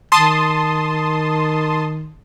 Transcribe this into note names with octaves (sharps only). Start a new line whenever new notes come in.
D#3 A5 C6 D#6